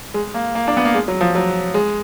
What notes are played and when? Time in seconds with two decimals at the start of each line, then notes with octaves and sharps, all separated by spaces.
0.14 G#3
0.34 A#3
0.55 A#3
0.68 D4
0.77 B3
0.85 A#3
0.95 G#3
1.08 F#3
1.21 F3
1.35 F#3
1.74 G#3